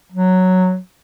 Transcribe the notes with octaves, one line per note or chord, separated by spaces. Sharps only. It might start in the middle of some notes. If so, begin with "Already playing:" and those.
F#3